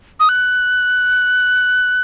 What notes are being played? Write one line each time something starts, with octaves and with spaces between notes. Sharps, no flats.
D#6
F#6